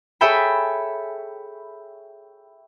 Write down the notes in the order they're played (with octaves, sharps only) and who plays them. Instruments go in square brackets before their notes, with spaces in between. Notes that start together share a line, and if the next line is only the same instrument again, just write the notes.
[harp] G#4 A4 C#5 E5 G5 B5